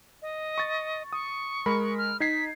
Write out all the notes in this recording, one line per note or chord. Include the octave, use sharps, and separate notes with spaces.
D#5
C#6 A6
C#6 D#6
G#3 A#4 B5
F6
D#4 G#6 B6 C7